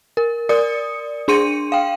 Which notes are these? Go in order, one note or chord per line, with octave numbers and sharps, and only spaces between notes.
A#4
A#4 D5 D#6 C#7
D4 G#4 C6 C#7 D#7
F5 G5